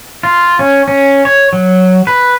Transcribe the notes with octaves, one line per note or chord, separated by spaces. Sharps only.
F4
C#4
C#4
C#5
F#3
B4